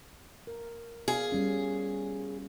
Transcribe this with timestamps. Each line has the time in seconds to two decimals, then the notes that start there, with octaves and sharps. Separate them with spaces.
0.47 A#4
1.08 B3 G#4 D5 F5
1.30 G3 C#4 F4